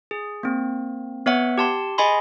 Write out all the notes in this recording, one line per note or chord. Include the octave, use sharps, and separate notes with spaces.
G#4
A#3 C4
B3 C#5 E5 F#5
G4 A5 C6
G#4 D#5 G#5 B5 C6